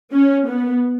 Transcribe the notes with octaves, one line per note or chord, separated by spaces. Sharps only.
C#4
B3